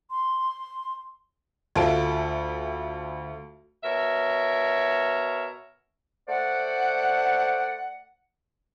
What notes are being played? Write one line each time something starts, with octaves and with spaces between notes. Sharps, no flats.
C6
D2 F4 A4 E5 A5 D7
B2 A#4 C#5 E5
A3 C5 D5 F#5